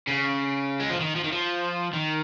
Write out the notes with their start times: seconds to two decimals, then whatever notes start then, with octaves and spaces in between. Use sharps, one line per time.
0.07 C#3
0.80 G#3
0.90 F3
1.00 D#3
1.16 F3
1.24 D#3
1.32 F3
1.93 D#3